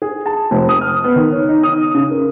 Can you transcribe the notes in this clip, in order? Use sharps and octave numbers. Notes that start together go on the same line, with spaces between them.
G#4
A5
F1
D#6
F6
B3
D#3
C#5
D#4
D#6
C#3
A#4